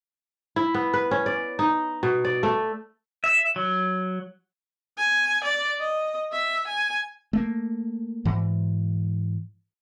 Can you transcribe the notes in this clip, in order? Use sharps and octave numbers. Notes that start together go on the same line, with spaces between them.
E4
B3
B4
C#4
D5
D#4
B2
D5
A3
E5
F#3
G#5
D5
D#5
E5
G#5
A3 A#3
G#2 E3